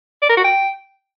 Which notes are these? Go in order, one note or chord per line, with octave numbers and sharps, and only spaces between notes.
D5
A#4
F#4
G5